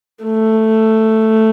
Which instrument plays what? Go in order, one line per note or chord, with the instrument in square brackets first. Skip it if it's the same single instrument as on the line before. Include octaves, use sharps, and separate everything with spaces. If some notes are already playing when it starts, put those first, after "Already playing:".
[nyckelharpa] A3